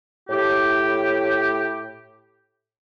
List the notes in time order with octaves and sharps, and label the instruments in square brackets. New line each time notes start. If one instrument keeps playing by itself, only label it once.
[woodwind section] A2 G4